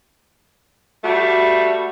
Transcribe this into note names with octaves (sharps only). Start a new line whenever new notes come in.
G3 A3 F#4